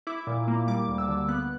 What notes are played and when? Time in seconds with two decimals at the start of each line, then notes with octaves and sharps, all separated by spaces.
0.07 E4 D6
0.27 A#2
0.48 A#3
0.68 G3 D6
0.88 D2
0.98 E6
1.09 D3
1.29 B3 F#6